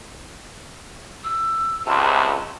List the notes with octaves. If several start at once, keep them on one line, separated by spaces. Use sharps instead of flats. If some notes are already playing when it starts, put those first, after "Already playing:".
E6
C#2 C3 A5